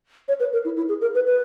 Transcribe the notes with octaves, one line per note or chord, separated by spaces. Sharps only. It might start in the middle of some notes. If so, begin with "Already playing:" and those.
C#5
B4
A#4
E4
E4
G#4
A#4
B4
B4